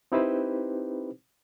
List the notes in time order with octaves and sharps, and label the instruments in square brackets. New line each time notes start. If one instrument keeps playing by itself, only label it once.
[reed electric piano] C4 D#4 E4 G4 B4 C5